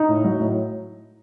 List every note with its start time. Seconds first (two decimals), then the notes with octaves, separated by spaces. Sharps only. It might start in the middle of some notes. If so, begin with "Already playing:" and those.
Already playing: D#4
0.09 A2
0.24 F#3
0.40 A2